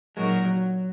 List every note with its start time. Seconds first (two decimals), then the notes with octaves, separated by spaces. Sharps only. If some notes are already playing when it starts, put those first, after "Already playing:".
0.16 A#2 F#3 G#3 D#4 F#4 A#4
0.45 F#3